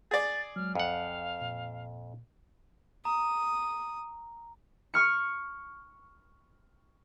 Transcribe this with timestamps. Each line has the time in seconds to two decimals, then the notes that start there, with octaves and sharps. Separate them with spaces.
0.11 G#4 D5 A6
0.56 F#3 G#3 F6
0.75 B1 F2 F5 F#5
1.41 A#2
3.05 A#5 D#6
4.94 C#6 F6 C#7